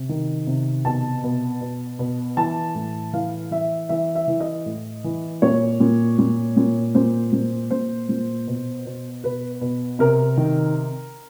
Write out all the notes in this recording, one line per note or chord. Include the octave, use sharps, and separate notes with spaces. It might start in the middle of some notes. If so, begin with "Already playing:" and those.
Already playing: C3
D#3
C3
B2 A5
B2
B2
B2
E3 A5
A2
E3 F5
E3 E5
E3 E5
E5
E3
D#5
A2
E3
A#2 C#5
A#2
A#2
A#2
A#2 C5
A#2
A#2 C5
A#2
B2
B2
B2 B4
B2
C3 A#4
D#3